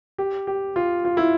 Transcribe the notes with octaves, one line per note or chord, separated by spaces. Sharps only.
G4
G4
F4
F4
E4